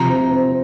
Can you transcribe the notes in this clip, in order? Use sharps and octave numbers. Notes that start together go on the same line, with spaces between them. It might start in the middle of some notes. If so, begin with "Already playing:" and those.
Already playing: C3 F3 A#5
C4
C4